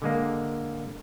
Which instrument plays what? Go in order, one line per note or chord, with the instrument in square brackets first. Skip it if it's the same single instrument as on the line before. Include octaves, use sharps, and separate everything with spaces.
[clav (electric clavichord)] D3 G#3 A#3